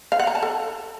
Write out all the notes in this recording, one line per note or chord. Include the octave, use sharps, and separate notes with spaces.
F5
F#5
A#5
A5
A4